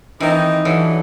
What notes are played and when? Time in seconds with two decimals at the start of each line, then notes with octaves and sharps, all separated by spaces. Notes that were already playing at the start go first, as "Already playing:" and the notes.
0.20 D#3 E3 C4 D#4
0.65 G2 D3 E3 F#3